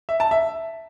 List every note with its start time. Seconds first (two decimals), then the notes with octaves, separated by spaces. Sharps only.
0.09 E5
0.20 A5
0.31 E5